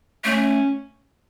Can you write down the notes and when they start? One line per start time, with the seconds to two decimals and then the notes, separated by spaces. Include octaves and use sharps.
0.25 A3 C#4